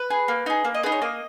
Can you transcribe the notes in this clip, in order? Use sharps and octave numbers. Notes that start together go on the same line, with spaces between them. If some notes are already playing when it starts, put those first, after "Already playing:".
Already playing: B4
G#4
A#3
D#4 G#4
A#3
D#5
D#4 G#4 B4
C#5
A#3 D#5